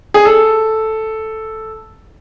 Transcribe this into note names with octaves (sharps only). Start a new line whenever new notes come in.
G#4
A4